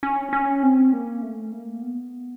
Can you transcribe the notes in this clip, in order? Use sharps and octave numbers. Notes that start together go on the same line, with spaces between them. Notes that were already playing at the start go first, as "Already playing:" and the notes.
C#4
C#4
C4
A#3
A3
A#3
B3